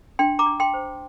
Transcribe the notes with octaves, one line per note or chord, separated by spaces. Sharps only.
D4 G5 C6
A#5 D6
D4
G5 C6
C5